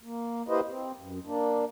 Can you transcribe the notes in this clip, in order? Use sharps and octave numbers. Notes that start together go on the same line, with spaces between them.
A#3
A#3 E4 G4 B4 C5 D#5
C4
F#2
A#3 D4